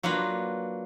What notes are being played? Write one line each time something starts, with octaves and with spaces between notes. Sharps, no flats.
F#3 A#3 D4 F4 B4